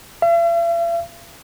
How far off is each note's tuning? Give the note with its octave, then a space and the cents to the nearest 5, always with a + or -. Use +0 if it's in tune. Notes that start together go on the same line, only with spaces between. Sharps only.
E5 +45